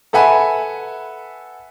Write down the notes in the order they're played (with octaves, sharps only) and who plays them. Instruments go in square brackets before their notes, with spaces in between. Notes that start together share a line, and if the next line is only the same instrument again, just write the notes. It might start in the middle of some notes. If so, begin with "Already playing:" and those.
[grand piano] A4 B4 E5 F#5 G#5 B5